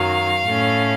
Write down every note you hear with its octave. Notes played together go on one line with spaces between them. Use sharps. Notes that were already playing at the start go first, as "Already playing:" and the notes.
Already playing: F#2 D#3 F#3 F5
A2 A3 C#4